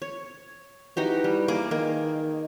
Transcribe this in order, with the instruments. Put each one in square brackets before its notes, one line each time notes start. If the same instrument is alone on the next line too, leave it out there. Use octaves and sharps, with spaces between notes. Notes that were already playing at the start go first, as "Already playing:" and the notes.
[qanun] C#5
[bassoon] E3 [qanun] D#4 F#4 G4
[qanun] G3
A#3 G#4 D6
[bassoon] D#3 [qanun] A#3